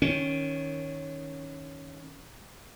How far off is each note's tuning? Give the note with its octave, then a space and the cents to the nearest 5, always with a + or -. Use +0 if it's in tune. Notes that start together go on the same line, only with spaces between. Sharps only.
D#3 +15 C#4 +0